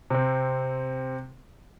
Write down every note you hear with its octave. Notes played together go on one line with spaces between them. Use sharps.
C3 C4